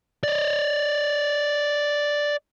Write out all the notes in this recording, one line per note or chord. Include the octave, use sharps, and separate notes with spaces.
D5 D#5